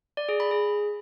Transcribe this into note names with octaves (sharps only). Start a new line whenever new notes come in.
D5
G#4
B5
G#4